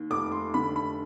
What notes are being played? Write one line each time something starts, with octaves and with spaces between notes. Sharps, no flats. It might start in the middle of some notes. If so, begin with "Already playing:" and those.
Already playing: D#2
F1 D6
C6
D3 B5
B5